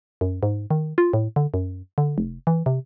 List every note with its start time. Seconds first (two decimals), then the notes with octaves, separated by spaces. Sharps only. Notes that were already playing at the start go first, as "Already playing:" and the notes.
0.21 F#2
0.43 G#2
0.71 D#3
0.98 F4
1.13 A2
1.36 D3
1.54 F#2
1.98 D3
2.18 F1
2.47 E3
2.66 C3